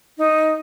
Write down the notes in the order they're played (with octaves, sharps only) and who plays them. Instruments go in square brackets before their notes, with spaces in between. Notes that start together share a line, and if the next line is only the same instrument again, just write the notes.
[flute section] D#4